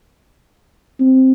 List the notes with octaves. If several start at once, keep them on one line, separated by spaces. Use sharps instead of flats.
C4